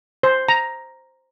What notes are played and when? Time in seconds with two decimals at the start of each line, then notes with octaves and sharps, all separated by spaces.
0.23 C5
0.48 A#5